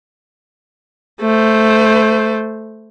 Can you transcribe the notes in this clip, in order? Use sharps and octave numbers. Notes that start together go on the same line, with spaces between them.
A3 C5